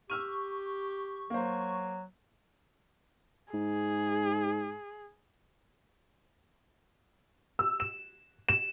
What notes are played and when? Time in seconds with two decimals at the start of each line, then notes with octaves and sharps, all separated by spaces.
0.10 G4 C#6 E6 F6 D#7
1.30 F#3 A#3 C5
3.54 G#2 G#4
7.59 E6
7.80 E7
8.49 E7